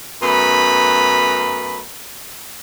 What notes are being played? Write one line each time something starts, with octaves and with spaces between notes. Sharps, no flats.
F#2 A3 B3 A#5 B5